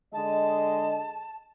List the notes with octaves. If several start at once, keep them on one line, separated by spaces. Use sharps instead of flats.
D3 G#3 D#5 A5